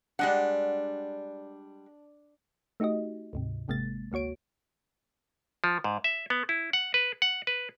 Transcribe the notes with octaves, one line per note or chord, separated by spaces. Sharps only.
G3 G#3 D4 F#5
A3 D#4 F#4 G4 D#5
D2 G#2 C3
G#1 C3 G#3 A#3 A6
D2 A#3 F#4 C#5 D7
F3
G#2
E5
B3
E4
F#5
B4
F#5
B4